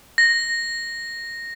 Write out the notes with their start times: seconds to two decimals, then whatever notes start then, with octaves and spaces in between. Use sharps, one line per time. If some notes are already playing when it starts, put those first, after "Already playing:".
0.18 A#6